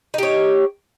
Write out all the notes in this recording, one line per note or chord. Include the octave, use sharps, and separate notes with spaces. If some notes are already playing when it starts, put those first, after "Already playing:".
D#4 G4 C#5